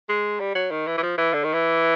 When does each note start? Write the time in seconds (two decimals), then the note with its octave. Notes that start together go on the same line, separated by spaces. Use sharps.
0.09 G#3
0.40 G3
0.55 F#3
0.71 D#3
0.87 E3
0.98 E3
1.03 F3
1.17 E3
1.34 D3
1.44 D#3
1.53 E3